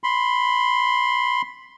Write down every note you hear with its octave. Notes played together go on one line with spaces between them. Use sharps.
B5 C6